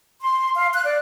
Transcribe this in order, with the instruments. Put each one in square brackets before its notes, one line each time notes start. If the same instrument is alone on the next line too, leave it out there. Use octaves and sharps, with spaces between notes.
[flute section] C6
F5
F#6
D5